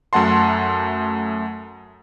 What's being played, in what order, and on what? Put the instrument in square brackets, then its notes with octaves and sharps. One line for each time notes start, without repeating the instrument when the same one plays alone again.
[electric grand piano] F#2 A3 F#5 A5 C6